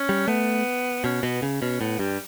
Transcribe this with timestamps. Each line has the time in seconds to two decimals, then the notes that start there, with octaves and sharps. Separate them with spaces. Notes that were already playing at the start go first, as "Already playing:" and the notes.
Already playing: C#4
0.09 G3
0.28 A3 B3
1.04 B2 C#4
1.23 B2 B3
1.42 C#3
1.61 B2 C#4
1.80 A2 B3
1.99 G2 G3